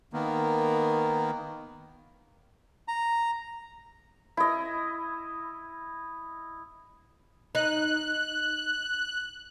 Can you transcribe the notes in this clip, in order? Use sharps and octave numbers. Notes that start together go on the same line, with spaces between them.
D#3 A#3 B3
A#5
E4 D#5
D#4 F#6